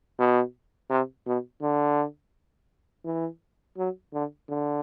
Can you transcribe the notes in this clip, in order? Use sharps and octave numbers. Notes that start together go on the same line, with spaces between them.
B2
C3
B2
D3
E3
F#3
D3
D3